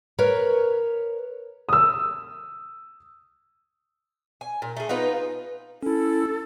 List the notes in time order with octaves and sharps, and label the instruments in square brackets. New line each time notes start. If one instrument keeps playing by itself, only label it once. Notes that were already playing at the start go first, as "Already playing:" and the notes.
[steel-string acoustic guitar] A#4 B4 C#5
[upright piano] D#6 E6
[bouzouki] G#5
A#2
A3 G#4
B3 D#4 F4 B4
[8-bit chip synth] C#4 E4 [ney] A4